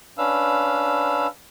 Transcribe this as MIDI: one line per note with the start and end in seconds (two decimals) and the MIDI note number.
0.18 1.27 61
0.18 1.27 62
0.18 1.27 71
0.18 1.27 77
0.18 1.27 88